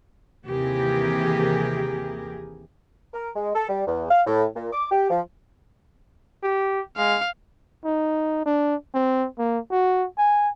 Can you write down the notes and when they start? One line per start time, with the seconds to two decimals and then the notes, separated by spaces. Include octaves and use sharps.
0.46 D#2 C3 E3 G4 G#4 A#4
3.13 A#4
3.36 G#3
3.55 A4
3.69 G3
3.87 E2
4.10 F5
4.26 A2
4.56 A#2
4.73 D6
4.91 G4
5.10 F3
6.43 G4
6.97 G#3 F5
7.85 D#4
8.46 D4
8.94 C4
9.39 A#3
9.71 F#4
10.18 G#5